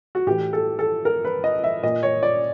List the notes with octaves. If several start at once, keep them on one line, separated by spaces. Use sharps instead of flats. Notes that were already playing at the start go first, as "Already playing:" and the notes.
F#4
A2 E3 G4
A4
A4
A#4
B4
D#5
E5
A#2 D#5
C#5
D5